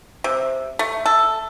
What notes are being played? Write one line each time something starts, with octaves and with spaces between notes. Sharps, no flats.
C3
A3
A4